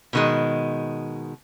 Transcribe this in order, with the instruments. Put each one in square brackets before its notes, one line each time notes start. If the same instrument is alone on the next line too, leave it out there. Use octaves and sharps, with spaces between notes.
[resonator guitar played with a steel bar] B2 D#3 G#3